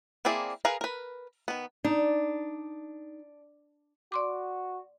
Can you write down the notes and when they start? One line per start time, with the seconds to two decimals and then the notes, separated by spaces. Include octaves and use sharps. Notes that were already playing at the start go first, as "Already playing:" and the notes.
0.25 A#3 C4 E4 G#4 D5
0.65 G#4 A#4 B4 F5 A#5
0.81 A#4 B4
1.48 D#3 B3
1.84 D4 D#4
4.12 F#4 D5 C6 D6